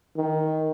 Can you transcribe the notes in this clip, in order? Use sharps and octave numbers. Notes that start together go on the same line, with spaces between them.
D#3